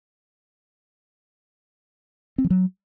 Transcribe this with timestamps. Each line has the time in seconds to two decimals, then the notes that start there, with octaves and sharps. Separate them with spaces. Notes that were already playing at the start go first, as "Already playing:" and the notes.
2.38 C4
2.44 F3
2.50 F#3